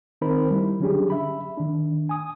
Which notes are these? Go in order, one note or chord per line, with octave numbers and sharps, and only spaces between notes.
D#3 C4 D#4 A#4 C5 B5
G3 E4
D3 F#3 C#4 D4 G4 G#4
E5 B5
D#3 D4
G#5 D#6